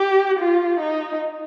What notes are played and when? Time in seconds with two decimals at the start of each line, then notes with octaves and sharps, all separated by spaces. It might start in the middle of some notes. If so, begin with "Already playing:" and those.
Already playing: G4
0.39 F4
0.80 D#4